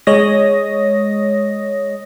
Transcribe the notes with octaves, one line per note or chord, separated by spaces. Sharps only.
G#3 C#5 D#5 D#6 A#6